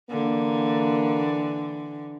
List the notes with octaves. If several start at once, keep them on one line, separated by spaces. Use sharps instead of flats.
D3 E3 A#3